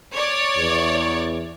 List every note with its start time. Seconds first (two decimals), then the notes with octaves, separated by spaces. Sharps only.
0.14 C#5 D5
0.58 E2